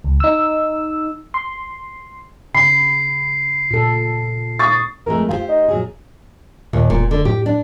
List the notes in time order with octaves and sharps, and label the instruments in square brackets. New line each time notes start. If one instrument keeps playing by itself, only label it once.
[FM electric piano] C#2
D#4 E6
C6
[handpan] C#3 [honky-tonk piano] B5 [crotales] C7
[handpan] A#2 A4
[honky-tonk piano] C#6 D#6 A6
[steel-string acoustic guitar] F2 G#3 A3 [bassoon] A#4
[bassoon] F4 [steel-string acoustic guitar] G4 G#4 C5
[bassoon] D#4
[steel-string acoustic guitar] A#2 F#3 G#4
[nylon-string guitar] D#2 [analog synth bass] A#2
[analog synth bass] E1 [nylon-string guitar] A#2
[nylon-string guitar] D3
[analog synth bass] A2 [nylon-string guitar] G4
[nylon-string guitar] D4